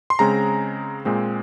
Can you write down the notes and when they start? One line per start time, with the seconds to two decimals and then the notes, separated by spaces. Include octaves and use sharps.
0.10 C6
0.19 C#3 G#3 C4 A#5
1.05 A#2 G#3 C4